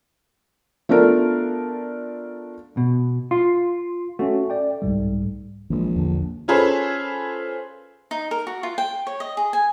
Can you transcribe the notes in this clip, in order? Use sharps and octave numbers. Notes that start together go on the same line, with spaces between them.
A3 B3 D4 F4 A#4
B2
F4 C6
A3 C#4 F#4
D5 G5
C2 G#2 G3
A#1 E3 F3 G#3
E2 D3
C#4 F4 G#4 A4 B4 C5
D#4
A#4
F#4
F4
G5
C#5
D#5
G#4
G#5